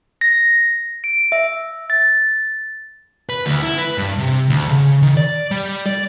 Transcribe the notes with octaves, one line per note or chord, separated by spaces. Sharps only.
A#6
D7
E5
A6
B4
D2
E4
B4
G2
C3
D2
C#3
D#3
D5
G3
D5